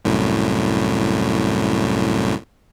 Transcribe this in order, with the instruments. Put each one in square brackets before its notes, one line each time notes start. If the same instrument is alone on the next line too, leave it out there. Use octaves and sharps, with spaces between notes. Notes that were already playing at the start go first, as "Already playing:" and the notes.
[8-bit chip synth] C2 F#2 A2